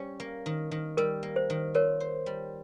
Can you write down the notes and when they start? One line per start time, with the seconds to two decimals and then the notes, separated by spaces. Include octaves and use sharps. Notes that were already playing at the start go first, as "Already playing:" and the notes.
Already playing: G3 C#4
0.20 A#3
0.46 D#3
0.71 D#3
0.97 G3 A#4
1.23 A#3
1.36 C5
1.50 D#3
1.74 F4 A#4 C#5
2.00 C5
2.26 G3